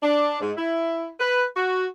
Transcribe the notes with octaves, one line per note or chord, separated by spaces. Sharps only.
D4
G#2
E4
B4
F#4